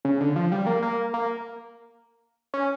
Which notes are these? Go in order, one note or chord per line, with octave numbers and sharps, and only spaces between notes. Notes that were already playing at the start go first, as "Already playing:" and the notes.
C#3
D3
F3
G3
A#3
A#3
A#3
C#4